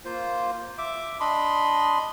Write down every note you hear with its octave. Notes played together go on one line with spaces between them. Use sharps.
A#3 F4 C5
E5 D6
D4 D#5 B5 C6